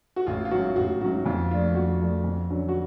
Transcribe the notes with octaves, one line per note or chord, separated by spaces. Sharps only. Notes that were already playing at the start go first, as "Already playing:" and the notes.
F#4
A1 F4
F4
G#2 F#3 C#4 F#4
A1 F#4
G#2 F#3 C#4 F#4
F2 F4
F3 A3 D4 F4
F2 F#4
F3 A3 D4
F2
D3 F#3 C#4
F#4